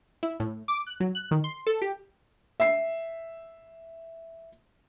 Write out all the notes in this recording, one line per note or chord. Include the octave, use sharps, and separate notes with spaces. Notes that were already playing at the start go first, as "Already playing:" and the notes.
E4
A2
D6
F#6
F#3
F#6
D#3
C6
A4
G4
E5 C7